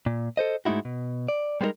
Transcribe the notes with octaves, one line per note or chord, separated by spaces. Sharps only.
A#2
A4 C5 D#5
G#2 G#3 A3 D#4 E4 F#4
B2
D5
G3 G#3 B3 D4 D#4 A#4